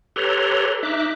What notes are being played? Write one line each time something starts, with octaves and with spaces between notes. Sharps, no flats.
G4 A4 B4 C#5 A#5 C6
D#4 E5 D6 F#6